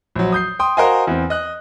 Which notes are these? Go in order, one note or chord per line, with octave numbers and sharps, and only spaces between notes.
A#1 F#3
D#6 G6 C7
G5 C6 D#6
F#4 A#4 C5 D#5 F5 G#5
E2 C4
D#5 F#6